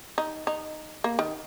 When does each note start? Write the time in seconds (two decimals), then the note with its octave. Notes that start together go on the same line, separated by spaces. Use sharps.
0.18 D#4
0.47 D#4
1.04 A#3
1.19 D#3